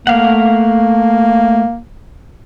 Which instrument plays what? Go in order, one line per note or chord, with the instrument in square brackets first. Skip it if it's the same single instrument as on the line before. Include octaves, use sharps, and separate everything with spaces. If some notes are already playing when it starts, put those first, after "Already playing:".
[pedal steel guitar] A3 F5 F#5 [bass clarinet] A#3